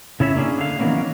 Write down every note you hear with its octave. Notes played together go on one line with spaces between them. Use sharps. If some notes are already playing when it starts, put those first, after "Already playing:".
C#3 E4 C#5 E5
A#3 C#4 D4 E4 G#4
D3 F5
D#3 E3 F#3 A#3 B3 C#4